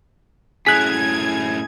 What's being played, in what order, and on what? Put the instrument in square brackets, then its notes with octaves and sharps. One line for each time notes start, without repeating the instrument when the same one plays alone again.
[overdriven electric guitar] F#2 A2 [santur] G#4 [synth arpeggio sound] F#6 B6 [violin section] G#6